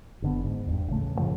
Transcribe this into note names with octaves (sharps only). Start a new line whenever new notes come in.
F#1 D3 B3
G#2
E2 G2
A1 C#3 A3
G2 A#2 C#3 F3